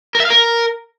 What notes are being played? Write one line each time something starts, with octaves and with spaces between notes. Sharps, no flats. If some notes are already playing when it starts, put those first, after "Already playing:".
A#4
E5
F5
A#4